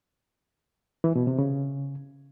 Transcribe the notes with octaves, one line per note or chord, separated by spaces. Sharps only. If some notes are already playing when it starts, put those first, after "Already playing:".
E3
B2
C3
C#3